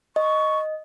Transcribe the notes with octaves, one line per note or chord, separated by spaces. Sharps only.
D#5 C#6